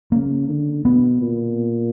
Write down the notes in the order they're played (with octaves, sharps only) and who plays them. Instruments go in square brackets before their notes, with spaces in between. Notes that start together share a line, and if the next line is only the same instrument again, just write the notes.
[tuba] C#3 [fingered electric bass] A#3
[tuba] D3
[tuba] B2 [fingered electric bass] B3
[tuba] A#2